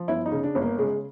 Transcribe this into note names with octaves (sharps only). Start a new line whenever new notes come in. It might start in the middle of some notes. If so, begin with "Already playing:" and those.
Already playing: F3
G1 E4
D#4
C#3
D4
G1
A#3
C#3 G#3